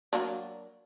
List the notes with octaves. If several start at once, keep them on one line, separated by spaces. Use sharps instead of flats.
F#3 A#3 D4